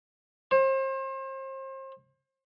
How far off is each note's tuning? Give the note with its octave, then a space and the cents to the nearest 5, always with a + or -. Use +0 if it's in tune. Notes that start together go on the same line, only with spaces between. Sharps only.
C5 +35